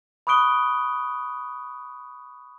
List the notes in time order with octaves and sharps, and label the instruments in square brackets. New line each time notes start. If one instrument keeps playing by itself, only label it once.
[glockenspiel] B5 C#6 D#6 F#6 D7 G7